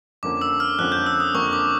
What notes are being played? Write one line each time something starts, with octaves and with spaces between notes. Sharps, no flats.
F2 D3 F3 A#3 C#4 D6
E6
F6
F2 D3 F3 A#3 C#4 F#6
G6
E6
D#6
F2 D3 F3 A#3 C#4 C#6
D6